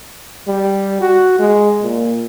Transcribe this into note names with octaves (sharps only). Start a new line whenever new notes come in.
G3
F#4
G#3
A#2